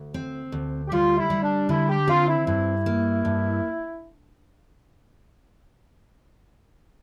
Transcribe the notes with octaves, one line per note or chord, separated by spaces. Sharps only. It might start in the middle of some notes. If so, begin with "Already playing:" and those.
Already playing: D2
C4
D2
G4
G3 F4
E4
G3
D4
D3 E4
G4
C4 F4
E4
G2 E4
A#3
G2